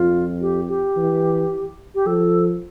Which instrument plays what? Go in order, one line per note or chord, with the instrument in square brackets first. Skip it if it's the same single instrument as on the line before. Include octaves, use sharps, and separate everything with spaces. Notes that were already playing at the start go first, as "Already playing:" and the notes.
Already playing: [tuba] F2 [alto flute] F4
[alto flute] G4
G4
[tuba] E3
[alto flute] G4
[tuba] F3 [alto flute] A4